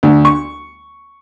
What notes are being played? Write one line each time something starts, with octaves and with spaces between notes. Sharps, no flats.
D2
C#6